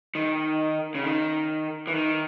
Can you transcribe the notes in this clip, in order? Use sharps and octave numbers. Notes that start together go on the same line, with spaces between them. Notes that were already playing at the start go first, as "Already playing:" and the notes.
D#3
C#3
D#3
E3
D#3